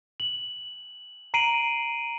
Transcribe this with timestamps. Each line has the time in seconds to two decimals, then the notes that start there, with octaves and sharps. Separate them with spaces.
0.20 F#7
1.34 A#5 C7 D7 D#7 F#7